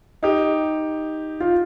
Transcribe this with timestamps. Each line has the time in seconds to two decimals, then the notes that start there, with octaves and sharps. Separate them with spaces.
0.23 D#4 G4
1.40 F4